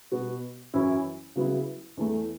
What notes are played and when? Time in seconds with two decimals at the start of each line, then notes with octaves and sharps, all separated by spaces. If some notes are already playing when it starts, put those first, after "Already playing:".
0.12 B2 B3 F#4
0.74 F#2 E3 C#4 E4
1.36 C#3 F#3 B3 E4
1.97 E2 E3 A3